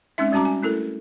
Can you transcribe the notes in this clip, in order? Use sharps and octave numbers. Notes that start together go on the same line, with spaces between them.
G#3 C4 C#4 D#4 E5
G3 C#4 F#4 A5 A#5 D6
G#5
A3 E4 A4 A#4